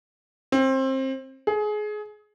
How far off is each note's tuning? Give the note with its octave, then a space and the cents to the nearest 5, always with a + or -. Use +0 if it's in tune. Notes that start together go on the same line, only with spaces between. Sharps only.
C4 +25
G#4 +25